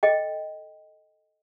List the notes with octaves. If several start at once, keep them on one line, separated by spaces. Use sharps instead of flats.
A4 D#5 G5